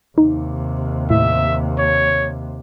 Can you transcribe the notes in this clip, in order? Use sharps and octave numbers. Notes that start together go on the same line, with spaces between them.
D#2 C3 D#4
A2 E5
C#5